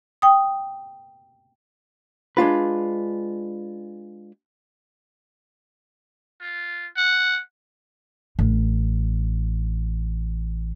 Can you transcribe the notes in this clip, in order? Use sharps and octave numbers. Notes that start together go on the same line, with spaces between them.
G5 D#6
G#3 D4 F4 B4
F4
F#5
A1 D4